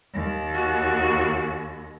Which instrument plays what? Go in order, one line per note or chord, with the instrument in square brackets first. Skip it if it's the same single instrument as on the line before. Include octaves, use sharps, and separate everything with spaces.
[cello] D#2
[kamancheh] F#4